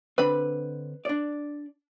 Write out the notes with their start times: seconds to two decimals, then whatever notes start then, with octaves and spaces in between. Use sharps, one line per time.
0.18 D3 C4 B4 B5
1.05 D4 D5